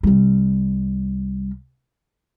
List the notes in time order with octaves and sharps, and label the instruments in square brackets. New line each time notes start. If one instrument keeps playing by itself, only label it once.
[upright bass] C2 G3